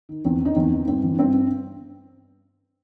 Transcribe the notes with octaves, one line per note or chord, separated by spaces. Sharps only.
D#3
E2 C4
D#3 D#4
E2 C4
D#3
G2 C4
E3
G2 C4